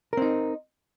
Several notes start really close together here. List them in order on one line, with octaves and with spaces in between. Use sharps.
A#4 C4 D#4